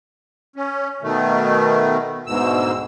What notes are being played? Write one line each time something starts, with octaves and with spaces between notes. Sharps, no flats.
C#4
B2 D#3 A3
D2 G#2 B2 E6